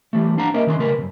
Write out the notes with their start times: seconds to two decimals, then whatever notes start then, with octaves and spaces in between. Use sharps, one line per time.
0.13 E3 G3 A3
0.38 D4 F5 F#5 A#5
0.54 A#3 C#4 A#4 D#5 E5
0.67 D#3 C#4 C6
0.79 C#3 G#3 A3 A#4 B4
0.98 F#2 B2